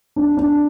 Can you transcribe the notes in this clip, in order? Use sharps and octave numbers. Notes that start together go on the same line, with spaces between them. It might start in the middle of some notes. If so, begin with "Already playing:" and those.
D4
D4